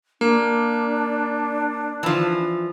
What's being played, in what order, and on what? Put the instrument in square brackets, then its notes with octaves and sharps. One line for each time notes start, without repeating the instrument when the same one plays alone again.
[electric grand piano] A#3 [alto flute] D4
[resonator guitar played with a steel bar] E3 F3